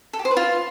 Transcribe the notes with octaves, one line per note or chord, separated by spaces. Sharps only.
A4
G4
C5
B4
F4